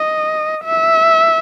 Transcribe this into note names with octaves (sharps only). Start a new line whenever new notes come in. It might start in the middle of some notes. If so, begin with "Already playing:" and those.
Already playing: D#5
E5